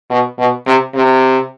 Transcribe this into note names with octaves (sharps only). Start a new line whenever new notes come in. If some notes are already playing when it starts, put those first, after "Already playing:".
B2
B2
C3
C3